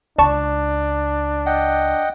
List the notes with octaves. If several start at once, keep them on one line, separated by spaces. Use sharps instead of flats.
C#2 D4 D5 A5 C#6
D#5 F#5 G5